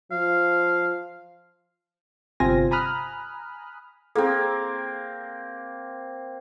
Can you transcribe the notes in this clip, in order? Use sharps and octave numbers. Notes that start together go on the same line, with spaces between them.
F3 F5
G1 C3 C4 F4 G#5 A#6
G#5 A#5 B5 D#6 F6 F#6
A#3 C4 E4 G#4 A4